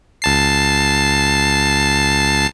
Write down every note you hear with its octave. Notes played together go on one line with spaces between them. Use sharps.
C#2 A5 C7